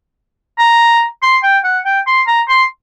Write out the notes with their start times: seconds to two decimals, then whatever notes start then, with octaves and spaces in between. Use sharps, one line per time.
0.59 A#5
1.23 C6
1.43 G5
1.64 F#5
1.85 G5
2.07 C6
2.27 A#5
2.49 C6